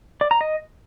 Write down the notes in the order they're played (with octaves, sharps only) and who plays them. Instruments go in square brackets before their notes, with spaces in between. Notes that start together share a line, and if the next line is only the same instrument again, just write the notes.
[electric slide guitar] D5
A#5
D#5